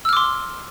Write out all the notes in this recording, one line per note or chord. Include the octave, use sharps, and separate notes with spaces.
C6 D6 E6 F6